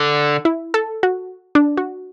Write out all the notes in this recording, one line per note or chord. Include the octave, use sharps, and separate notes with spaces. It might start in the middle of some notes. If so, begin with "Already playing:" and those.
Already playing: D3
E4
A4
F#4
D4
F#4